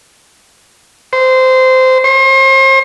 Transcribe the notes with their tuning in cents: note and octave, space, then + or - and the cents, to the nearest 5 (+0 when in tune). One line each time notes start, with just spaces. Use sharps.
C5 -15
C5 +40